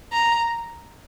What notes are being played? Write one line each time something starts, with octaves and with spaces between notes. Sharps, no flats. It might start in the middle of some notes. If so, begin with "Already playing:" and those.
A#5